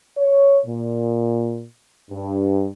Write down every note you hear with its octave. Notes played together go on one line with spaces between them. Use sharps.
C#5
A#2
G2